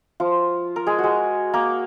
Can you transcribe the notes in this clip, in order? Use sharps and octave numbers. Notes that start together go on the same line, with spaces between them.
F3 F4
A#4
G#3 G#4
G#3 F#4 G#4
A#3 A#4